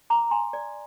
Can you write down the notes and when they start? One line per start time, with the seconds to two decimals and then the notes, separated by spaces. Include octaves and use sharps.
0.10 A#5 D6
0.31 G#5 C6
0.53 D5